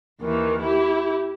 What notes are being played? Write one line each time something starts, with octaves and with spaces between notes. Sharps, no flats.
D#2 D#3 E3
E4 G4